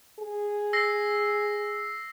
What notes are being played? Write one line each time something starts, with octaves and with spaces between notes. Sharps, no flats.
G#4
E6 A#6 C7